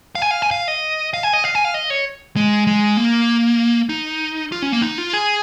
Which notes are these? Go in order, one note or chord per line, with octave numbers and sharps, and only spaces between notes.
F5
G#5
F5
G#5
F5
D#5
F5
G#5
D#5
F5
G#5
F5
D#5
C#5
G#3
G#3
A#3
D#4
F4
C#4
A#3
D#4
F4
G#4